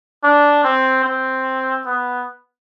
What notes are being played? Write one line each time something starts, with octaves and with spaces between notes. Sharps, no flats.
D4
C4
C4
B3